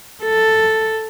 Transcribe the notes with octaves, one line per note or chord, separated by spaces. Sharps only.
A4